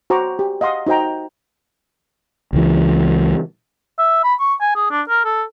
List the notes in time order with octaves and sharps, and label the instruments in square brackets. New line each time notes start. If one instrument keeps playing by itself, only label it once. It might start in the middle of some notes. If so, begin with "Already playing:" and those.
[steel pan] F#4 C5 A#5 C#6 D6
G4
D#5 F5 F#5 C6 D#6
D#4 F#4 C5 G5 A#5
[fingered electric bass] C#2 E3
[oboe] E5
B5
C#6
G#5
G#4
D4
A#4
A4